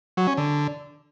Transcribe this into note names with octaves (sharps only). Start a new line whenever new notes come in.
F#3
C#4
D3